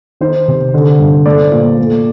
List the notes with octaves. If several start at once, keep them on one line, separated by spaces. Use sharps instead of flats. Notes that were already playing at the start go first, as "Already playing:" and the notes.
D#3 C5
C3
D3
G2
A3 D5
A#2
A3